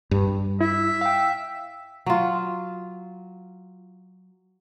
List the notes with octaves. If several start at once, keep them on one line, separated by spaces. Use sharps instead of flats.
G2
E4 E5
F5 G5
F#3 F4